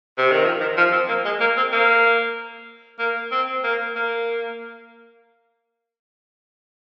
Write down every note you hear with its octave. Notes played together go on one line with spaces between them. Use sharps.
C3
D#3
F3
D#3
F3
C4
A#3
G#3
A#3
C4
A#3
A#3
C4
A#3
A#3